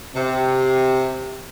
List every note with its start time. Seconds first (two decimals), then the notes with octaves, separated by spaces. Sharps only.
0.15 C3